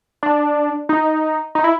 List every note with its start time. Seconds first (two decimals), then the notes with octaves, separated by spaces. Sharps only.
0.23 D4
0.89 D#4
1.55 D#4
1.64 E4